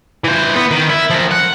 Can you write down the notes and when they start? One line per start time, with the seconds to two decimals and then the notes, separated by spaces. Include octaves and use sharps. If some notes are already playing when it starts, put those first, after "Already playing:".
0.24 E3 C5
0.56 B3
0.71 D#3
0.90 E4
1.10 F3 A#4
1.31 F#5